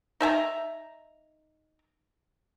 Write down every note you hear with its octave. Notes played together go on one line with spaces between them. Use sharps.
D#4 E5 G#5 A#5